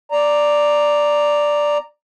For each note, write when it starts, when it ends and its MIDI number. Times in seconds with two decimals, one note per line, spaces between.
0.12 1.78 74
0.12 1.78 82